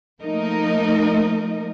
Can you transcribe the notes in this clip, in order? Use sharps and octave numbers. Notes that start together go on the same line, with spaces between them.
F3 A3 A#3 D#4 A#4 D#5